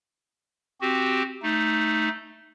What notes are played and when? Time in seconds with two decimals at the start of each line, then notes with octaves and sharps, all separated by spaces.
0.81 C4 F#4 G4
1.42 A3 D#4